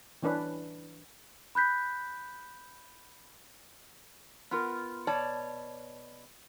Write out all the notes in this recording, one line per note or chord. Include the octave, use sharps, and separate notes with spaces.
E3 C#4 D4 B4
B5 F#6 G6 B6
B3 F4 A#4
B2 C#5 D5 A5